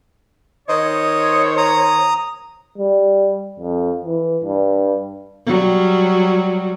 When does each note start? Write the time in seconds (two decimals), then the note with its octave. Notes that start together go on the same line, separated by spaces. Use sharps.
0.69 D#3 C5 C#5 D#5
1.58 A#5 D#6
2.78 G3
3.59 F2
4.05 E3
4.44 G2
5.46 F#3 G3